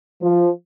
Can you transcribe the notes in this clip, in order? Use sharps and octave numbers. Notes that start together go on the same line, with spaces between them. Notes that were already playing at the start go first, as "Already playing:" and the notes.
F3